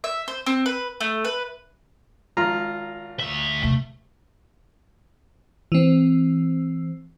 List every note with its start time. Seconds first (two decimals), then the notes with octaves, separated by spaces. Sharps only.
0.04 E5
0.28 C5
0.46 C4
0.66 B4
1.00 A3
1.25 B4
2.37 G#1 F4 A#5
3.20 D2 E5
3.63 D#2 C3 A3
5.72 E3 C4